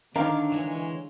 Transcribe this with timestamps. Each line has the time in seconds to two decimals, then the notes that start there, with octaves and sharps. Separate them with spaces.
0.16 D3 D#3 D4 A#4 C#5 F5 D6
0.52 E3 G#3 C#5